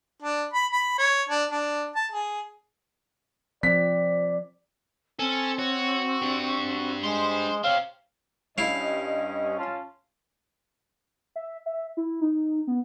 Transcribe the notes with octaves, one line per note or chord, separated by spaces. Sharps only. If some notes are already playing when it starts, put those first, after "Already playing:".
D4
B5
B5
C#5
D4
D4
A5
G#4
F3 C4 D5 B6
C4 C#4 A4
F#4 C#5
D4 G4
G#3 C5 G#5
C4 G4 C#5 F5
G2 C#4 E4 D#5 F5
C#4 F4 A5
E5
E5
E4
D#4
B3